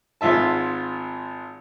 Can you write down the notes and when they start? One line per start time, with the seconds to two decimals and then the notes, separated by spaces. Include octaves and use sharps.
0.21 G#1 G#2 F4 E5 A5